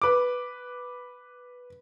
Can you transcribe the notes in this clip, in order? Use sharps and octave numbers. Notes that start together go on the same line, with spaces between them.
B4 D6